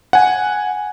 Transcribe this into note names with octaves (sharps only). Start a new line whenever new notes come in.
F#5 G#5